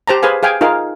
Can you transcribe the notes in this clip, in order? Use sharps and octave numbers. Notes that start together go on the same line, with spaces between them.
G4 C5 A5 A#5
G#4 B4 C5 F5 G#5
G#4 F5 G5 G#5
D#4 F4 G#4 A#4 F5